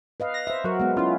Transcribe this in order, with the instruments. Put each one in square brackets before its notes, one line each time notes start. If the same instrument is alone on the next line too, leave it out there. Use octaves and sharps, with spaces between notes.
[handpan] B4 D#5 F5
[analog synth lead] A#6
[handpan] C5 E5
[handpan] F#3 A#4 [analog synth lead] F#4
[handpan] G#3 B3
[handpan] C#4 E4 [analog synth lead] F4